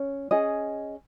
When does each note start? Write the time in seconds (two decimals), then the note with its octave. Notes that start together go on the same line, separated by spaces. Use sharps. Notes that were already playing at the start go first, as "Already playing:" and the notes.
Already playing: C#4 C#5
0.31 C#4 G#4 D#5